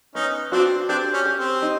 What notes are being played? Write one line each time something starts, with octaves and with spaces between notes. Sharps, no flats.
B3 C#4 D#4
C4 D4 F#4
C4 D4 G4
C#4
G4
C4
D#4